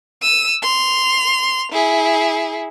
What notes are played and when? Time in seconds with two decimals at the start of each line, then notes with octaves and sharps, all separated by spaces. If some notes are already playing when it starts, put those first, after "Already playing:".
0.22 E6 D#7
0.62 C6 F7
1.72 E4 G#4